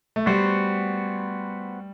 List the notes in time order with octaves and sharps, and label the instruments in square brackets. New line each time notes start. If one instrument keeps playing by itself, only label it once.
[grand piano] A3
[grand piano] G3 [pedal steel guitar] B3 F#4 C5